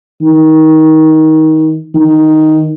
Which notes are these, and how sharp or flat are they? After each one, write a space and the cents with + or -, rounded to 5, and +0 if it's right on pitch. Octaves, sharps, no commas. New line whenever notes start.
D#3 +20
D#3 +0